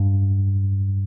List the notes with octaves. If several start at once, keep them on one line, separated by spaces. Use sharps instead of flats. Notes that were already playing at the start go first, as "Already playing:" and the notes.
Already playing: G2